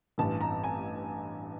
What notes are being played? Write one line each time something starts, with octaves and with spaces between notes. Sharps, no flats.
A1 G2 E3 A5
A#5
G#5